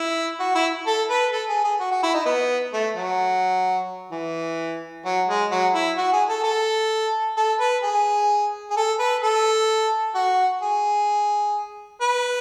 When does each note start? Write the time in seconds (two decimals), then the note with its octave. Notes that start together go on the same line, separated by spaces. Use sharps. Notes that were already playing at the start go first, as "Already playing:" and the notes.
Already playing: E4
0.40 F#4
0.55 E4
0.86 A4
1.10 B4
1.33 A4
1.49 G#4
1.64 G#4
1.80 F#4
1.91 F#4
2.03 E4
2.14 D#4
2.26 B3
2.73 A3
2.96 F#3
4.12 E3
5.05 F#3
5.28 G#3
5.51 F#3
5.74 E4
5.97 F#4
6.12 G#4
6.29 A4
6.44 A4
7.37 A4
7.60 B4
7.83 G#4
8.70 G#4
8.77 A4
8.99 B4
9.23 A4
10.15 F#4
10.62 G#4
12.01 B4